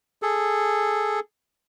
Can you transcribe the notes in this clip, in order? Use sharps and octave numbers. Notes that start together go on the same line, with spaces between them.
G#4 A4